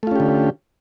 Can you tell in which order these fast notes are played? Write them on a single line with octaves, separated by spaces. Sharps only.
A3 F4 C#4 G4 D3